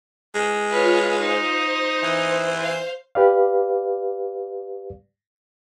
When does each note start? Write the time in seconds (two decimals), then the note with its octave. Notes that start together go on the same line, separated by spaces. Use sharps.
0.35 G#3
0.69 F4 B4 C#5 F5
1.19 D#4 C5
2.03 E3
2.61 F5
3.15 G4 B4 D5 F5